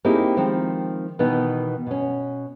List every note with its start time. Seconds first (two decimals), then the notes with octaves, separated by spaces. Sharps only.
0.05 A#3 C4 D#4 E4 G4 G#4
0.37 D#3 F3 G#3 C4
1.19 B2 D#3 E3 B3 D#4
1.86 B2 C#4